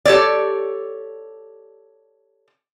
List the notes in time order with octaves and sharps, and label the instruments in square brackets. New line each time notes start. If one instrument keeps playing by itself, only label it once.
[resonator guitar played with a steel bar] G4 A4 C#5 D5